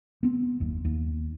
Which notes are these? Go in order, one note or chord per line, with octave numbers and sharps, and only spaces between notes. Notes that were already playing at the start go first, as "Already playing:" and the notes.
B3 C4
F#1 D#2
D#2